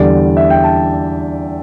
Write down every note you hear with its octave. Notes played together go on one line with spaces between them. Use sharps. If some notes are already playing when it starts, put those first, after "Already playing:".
Already playing: E2 D3 G3 D5
E5
G5
A5